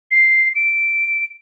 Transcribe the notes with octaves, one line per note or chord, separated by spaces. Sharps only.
C7
D7